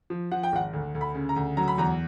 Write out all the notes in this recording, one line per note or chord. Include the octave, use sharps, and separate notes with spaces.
F3
F3 F#5
G5
G#1 F#5
D2
D2
B5
C#3
A#5
D2
F#3 A#5
B5
E2 A#5